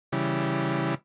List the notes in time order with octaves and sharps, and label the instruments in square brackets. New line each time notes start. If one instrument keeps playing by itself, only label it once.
[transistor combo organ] C#3 E3 G3